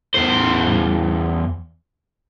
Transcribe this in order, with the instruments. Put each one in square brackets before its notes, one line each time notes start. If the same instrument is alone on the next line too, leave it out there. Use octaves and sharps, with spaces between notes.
[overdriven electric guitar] E2 C5